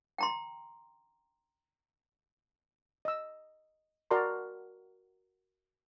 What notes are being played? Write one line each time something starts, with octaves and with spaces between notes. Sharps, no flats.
G5 A#5 C6
D#5 E6
F#4 A#4 D5 A5 A#5 C6